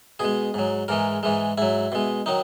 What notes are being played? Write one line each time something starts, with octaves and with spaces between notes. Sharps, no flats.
B2 G#3 G#4
G#2 F#3
G#2 E3 G#3 A#4
G#2 E3 G#3
G#2 F#3 E4
B2 G#3
D#3 F#3 D#4